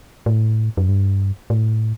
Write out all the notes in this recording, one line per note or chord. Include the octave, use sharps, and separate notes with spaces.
A2
F#2
G2
A2